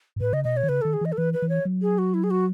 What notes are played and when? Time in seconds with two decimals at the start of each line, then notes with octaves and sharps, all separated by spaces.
0.16 G#2
0.21 A2 B4
0.33 C#3 D#5
0.44 B2 D#5
0.57 C#5
0.63 D#3
0.69 C#3 B4
0.82 D#3 A4
0.93 G#4
1.01 E3 D#5
1.12 A4
1.18 E3 B4
1.34 B4
1.42 E3
1.49 C#5
1.65 F#3
1.82 G#4
1.98 F#4
2.14 E4
2.24 G#4
2.30 F#4